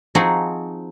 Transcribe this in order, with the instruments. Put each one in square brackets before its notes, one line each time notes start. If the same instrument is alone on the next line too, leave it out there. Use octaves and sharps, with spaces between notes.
[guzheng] F3 C4 D#4 F#4 G#4